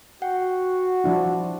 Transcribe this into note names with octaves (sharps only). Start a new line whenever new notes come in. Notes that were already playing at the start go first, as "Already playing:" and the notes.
F#4 F#5 G5
F3 D4 E4